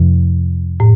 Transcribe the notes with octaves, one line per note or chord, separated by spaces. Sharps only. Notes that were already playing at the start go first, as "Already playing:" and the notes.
Already playing: F2 C3 F3
A2